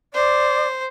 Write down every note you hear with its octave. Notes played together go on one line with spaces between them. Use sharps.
C5 D5